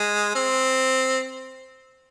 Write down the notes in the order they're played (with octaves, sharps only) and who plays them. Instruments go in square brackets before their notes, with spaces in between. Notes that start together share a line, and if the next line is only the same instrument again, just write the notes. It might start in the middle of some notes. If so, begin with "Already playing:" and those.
Already playing: [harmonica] G#3
C4